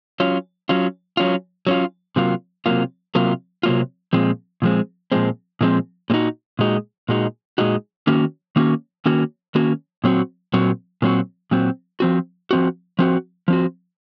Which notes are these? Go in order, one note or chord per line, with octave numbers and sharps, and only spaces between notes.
F#3 C#4 F4
F#3 C#4 F4
F#3 C#4 F4
F#3 C#4 F4
C3 F#3 A#3 F4
C3 F#3 A#3 F4
C3 F#3 A#3 F4
C3 F#3 A#3 F4
A#2 F3 G#3 C4
A#2 F3 G#3 C4
A#2 F3 G#3 C4
A#2 F3 G#3 C4
A#2 G#3 D#4 F#4
A#2 G#3 D#4 F#4
A#2 G#3 D#4 F#4
A#2 G#3 D#4 F#4
D#3 A#3 C#4 F#4
D#3 A#3 C#4 F#4
D#3 A#3 C#4 F#4
D#3 A#3 C#4 F#4
A#2 F#3 C4 F#4
A#2 F#3 C4 F#4
A#2 F#3 C4 F#4
A#2 F#3 C4 F#4
F3 C4 F#4
F3 C4 F#4
F3 C4 F#4
F3 C4 F#4